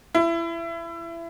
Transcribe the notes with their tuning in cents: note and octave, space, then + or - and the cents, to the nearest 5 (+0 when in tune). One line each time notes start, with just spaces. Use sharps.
E4 +25